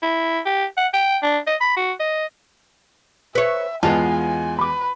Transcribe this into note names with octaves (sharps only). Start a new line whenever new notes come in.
E4
G4
F#5
G5
D4
D#5
B5
F#4
D#5
B4 C#5 E5
E2 G#3 B3 F4 G#5 A5
B4 B5 D6